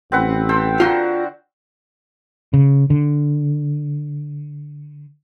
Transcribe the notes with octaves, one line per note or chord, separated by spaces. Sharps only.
A1 C4 B4 F#5
A4 C5 G5
D3 F4 F#4 A#4 G5
C#3
D3